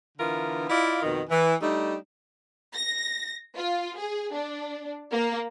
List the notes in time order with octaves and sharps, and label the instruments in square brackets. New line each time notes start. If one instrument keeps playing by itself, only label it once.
[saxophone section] D3 E3 B3 F4 A#4
E4 F4 D5 D#5 F5
F2 B2 D#3
E3
G3 A3 D4 D#4
[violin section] A#6
F4
G#4
D4
A#3